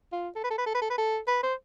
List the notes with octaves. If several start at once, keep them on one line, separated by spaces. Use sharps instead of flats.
F4
A4
B4
A4
B4
A4
B4
A4
B4
A4
B4
C5